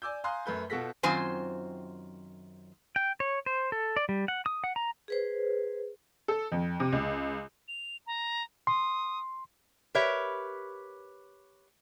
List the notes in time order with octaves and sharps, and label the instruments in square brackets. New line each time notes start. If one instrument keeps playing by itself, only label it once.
[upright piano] D5 G#5 D6 E6 G6
F5 G#5 A#5 C6 D#6 F#6
F#2 A3 B4 G6
B2 F4 A4 F#5 A#6 B6
[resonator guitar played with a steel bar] F#2 D#3 C4 F4 C5 G#5
[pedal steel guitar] G5
C#5
C5
A4
D5
G3
F#5
D#6
F#5
A#5
[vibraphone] G#4 B4 C5
[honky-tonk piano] A4
F2
C3
C#2
[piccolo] F7
A#5
[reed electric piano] C6 [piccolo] D#6
[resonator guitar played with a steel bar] G4 A#4 B4 C#5 E5